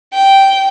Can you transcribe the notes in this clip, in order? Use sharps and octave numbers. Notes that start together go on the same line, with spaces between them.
G5